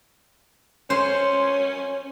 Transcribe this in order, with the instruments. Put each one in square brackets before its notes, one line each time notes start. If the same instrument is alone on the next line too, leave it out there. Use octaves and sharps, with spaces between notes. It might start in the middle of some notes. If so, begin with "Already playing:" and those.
[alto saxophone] C#4 [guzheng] C5